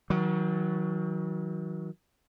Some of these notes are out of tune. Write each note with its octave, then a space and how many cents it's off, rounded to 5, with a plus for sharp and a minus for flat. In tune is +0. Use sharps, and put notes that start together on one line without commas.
D#3 +45 F#3 +0